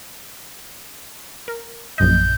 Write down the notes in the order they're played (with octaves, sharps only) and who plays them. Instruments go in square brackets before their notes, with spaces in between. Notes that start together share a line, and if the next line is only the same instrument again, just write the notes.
[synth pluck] A#4
[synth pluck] A#1 F#2 D#5 [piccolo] G6